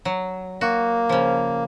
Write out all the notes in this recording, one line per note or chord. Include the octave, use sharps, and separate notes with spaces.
F#3
A#3 F#4
C#3 F3